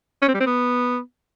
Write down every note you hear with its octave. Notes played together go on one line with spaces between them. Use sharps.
C#4
C4
G3
C4
B3